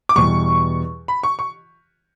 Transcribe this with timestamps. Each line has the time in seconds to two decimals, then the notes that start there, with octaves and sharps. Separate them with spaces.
0.09 D6
0.16 E2 B2 G3 C#6
1.08 B5
1.23 C#6
1.39 C#6